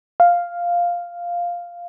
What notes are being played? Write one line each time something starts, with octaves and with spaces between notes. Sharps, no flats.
F5